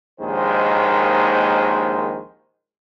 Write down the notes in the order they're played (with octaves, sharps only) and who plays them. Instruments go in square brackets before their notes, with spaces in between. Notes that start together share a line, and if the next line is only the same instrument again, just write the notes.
[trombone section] A#1 D#2 D#3 G#3 C5